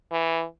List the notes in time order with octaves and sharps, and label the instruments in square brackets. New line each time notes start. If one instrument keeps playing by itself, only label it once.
[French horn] E3